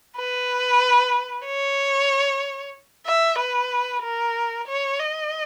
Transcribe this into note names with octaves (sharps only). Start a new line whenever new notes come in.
B4
C#5
E5
B4
A#4
C#5
D#5